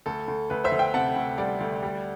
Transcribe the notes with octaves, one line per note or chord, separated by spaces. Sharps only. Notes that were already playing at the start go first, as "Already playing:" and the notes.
D2 A4
D2
D2 B4
C5 E5
D2
E5 G5
C3 F#5 A5
D2
G3 D5 F#5
D2
G3